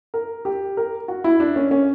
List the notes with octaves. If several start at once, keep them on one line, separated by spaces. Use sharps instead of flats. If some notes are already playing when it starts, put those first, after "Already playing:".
A#4
G4
A#4
F#4
E4
D4
C#4
C#4